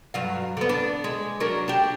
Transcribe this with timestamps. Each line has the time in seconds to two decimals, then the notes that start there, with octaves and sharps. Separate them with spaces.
0.14 G2 F#3 F5
0.57 D3 B3
0.69 D4
1.04 G#3
1.40 F#3 D4 A#4
1.68 D4 G4